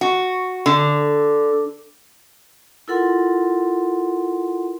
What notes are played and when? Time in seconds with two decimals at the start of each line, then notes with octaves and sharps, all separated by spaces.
0.01 F#4
0.66 D3
2.88 E4 F4 A4 A#4 F#5 C6